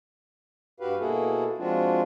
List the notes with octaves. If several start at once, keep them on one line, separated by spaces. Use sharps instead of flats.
G2 F#4 G4 B4 F5
B2 A#3 E4 F#4 G#4 A4
F3 G#3 C4 D4 F4 F#4